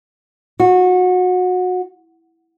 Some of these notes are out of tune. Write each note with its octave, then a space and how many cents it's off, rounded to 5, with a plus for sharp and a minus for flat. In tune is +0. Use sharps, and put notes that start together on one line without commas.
F#4 -25